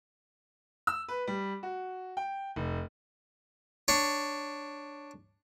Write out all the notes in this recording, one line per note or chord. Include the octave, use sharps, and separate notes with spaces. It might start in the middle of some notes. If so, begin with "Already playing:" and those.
E6
B4
G3
F#4
G5
F1
D4 C#5